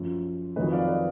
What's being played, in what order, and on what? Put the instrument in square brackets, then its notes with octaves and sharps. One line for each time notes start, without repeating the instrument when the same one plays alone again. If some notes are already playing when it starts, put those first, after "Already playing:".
Already playing: [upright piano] F#2 F3
F2 D#3 F#3 B4 D#5
D5 F5
B4 D#5